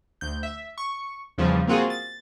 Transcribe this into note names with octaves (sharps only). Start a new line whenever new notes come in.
D2 G6
E5
C#6
E2 C#3 F3 G3
A#3 C4 F4 F#4 G#4
A6